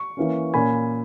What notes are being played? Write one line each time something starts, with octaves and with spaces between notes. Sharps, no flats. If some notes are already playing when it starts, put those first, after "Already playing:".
Already playing: C#6
E3 A#3 C#4
A#2 A#3 C#4 G#5 B5